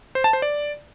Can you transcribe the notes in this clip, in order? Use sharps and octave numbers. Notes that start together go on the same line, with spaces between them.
C5
A5
C5
D5